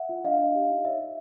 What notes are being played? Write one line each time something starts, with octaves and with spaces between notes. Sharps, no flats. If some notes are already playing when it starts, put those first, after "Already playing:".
Already playing: E5 F#5
F4
D4 D#5 F5
D4
G4
D#4
C#5 E5
D#4